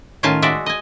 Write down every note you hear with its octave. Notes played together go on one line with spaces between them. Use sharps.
A2 D#3 C#4 F4 G#5 A5
G#3 F#4 D5 E5
D#5 G#5